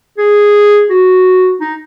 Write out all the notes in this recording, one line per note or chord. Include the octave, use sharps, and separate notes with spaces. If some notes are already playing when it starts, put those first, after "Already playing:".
G#4
F#4
D#4